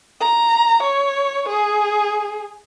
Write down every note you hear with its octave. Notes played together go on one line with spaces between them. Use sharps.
A#5
C#5
G#4